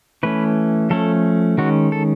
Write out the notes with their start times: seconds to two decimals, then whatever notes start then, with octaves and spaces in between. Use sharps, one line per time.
0.23 E3 A3 C#4 B4
0.90 F3 A3 C#4 A4
1.58 D#3 G#3 C#4 F#4
1.92 A4